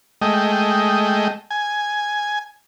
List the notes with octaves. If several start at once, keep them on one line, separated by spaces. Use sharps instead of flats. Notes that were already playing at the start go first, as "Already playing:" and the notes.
G#3 A3 D#5 G5
G#5